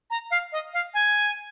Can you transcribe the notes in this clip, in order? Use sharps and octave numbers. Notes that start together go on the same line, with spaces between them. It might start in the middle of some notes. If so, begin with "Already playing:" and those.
A#5
F5
D#5
F5
G#5